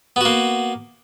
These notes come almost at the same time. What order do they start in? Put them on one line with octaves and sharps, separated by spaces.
B3 F#4 A#3